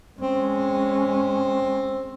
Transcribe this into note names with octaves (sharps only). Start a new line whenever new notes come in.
G#3 C4 C#4